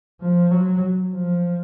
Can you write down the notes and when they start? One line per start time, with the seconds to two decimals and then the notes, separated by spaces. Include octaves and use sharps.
0.21 F3
0.51 F#3
1.14 F3